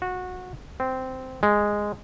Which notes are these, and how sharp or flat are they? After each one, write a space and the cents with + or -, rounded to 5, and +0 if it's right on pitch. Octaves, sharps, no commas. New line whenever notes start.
F#4 -20
C4 -10
G#3 -5